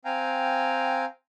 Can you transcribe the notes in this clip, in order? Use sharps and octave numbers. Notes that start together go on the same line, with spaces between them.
C4 F5 G5 G#5 A#5